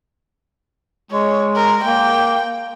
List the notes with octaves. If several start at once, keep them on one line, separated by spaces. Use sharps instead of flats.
G#3 C#5
A#4
A#3 G5